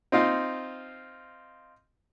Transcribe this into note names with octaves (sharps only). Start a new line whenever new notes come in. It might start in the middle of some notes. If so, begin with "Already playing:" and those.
C4 D#4 F4 F5